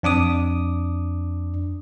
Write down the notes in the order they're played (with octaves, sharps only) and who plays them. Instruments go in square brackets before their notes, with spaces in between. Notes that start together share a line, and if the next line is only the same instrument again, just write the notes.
[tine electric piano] F2 D4 D6 D#6